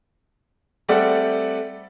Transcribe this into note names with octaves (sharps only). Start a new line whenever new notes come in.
G3 A3 C4 A4 D5 F#5